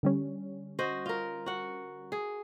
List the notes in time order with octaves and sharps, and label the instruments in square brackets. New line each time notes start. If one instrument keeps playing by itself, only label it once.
[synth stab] D3 G3 C#4
[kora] F#4 C5 D#5
F4 A#4
F#4 F#5
G#4